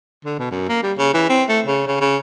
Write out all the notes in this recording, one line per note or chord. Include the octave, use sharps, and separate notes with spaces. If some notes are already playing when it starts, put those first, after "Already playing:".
D3
B2
F#2
A#3
G3
C#3
E3
C4
A3
C#3
C#3
C#3